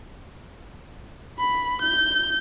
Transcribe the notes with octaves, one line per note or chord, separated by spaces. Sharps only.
B5
G6